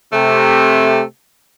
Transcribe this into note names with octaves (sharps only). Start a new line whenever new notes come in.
C3 A3